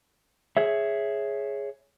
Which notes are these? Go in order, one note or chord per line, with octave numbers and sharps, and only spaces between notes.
G#4 C#5 E5